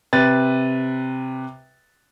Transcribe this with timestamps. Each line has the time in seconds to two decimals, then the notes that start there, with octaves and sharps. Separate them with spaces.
0.13 C3 B4 A6